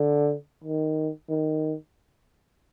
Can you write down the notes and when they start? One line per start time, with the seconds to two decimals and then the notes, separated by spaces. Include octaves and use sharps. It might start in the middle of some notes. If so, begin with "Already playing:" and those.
Already playing: D3
0.64 D#3
1.29 D#3